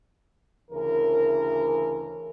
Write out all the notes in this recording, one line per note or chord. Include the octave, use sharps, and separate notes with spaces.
D2 C#3 E3 A#4